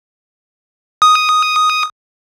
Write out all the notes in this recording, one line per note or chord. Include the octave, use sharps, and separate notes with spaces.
D#6